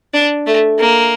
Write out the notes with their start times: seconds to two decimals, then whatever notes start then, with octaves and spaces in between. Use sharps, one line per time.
0.14 D4
0.46 A3
0.79 A#3